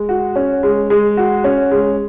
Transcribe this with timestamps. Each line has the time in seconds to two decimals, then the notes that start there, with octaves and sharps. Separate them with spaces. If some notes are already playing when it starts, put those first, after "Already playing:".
Already playing: G#3
0.09 F#4
0.36 C#4
0.63 G#3
0.90 G#3
1.17 F#4
1.44 C#4
1.72 G#3